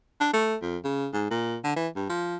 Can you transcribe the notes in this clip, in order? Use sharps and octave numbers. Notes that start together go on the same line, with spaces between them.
D4
A3
F2
C#3
G#2
A#2
D3
E3
G2
F3